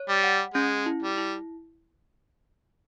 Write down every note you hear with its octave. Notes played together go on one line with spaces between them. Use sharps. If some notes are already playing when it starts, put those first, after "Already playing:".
Already playing: C#5
G3
F#5
G#3 C#4
E4
G3
E4